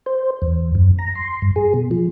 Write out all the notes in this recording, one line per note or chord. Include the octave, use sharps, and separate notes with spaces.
C5
E2
F#2
A#5
C6
G2
G#4
B2
F3